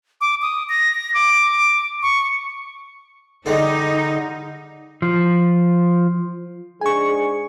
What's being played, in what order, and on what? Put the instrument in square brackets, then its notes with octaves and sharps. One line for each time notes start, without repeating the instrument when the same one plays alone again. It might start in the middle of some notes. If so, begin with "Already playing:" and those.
[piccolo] D6
D#6
A#6
D6
C#6
[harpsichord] D3 G3 G#3 [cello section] D#4
[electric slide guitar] F3
[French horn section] G#2 D4 G#4 [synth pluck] G#5 C#6